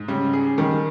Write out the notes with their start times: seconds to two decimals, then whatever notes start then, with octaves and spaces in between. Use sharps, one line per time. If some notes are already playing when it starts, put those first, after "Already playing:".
Already playing: G#2
0.08 C#3 G3
0.33 G#4
0.58 D#3 G3